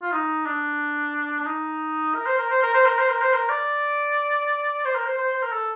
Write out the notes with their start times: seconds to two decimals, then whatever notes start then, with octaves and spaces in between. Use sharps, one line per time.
0.02 F4
0.12 D#4
0.45 D4
1.40 D4
1.46 D#4
2.15 A#4
2.26 C5
2.38 A#4
2.50 C5
2.63 A#4
2.74 C5
2.86 A#4
2.99 C5
3.10 A#4
3.22 C5
3.34 A#4
3.49 D5
4.85 C5
4.95 A#4
5.06 C5
5.18 C5
5.34 C5
5.43 A#4
5.52 A4